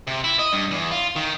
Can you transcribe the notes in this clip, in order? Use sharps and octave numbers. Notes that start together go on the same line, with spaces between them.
C3
E4
D#5
G2
E2
F4
D#3